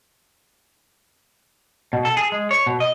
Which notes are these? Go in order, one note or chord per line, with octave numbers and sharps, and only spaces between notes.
B2
A4
G#4
G#3
C#5
B2
D#5